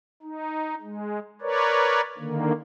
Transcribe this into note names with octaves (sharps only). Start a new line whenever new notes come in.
D#4
G#3
A#4 B4 C#5 D5
D3 D#3 A#3